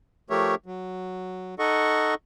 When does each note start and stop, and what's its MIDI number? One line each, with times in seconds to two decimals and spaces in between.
0.30 0.55 53
0.30 0.55 57
0.30 0.55 67
0.30 0.55 70
0.30 0.55 73
0.30 0.55 76
0.66 1.55 54
1.59 2.14 63
1.59 2.14 69
1.59 2.14 75
1.59 2.14 78
1.59 2.14 85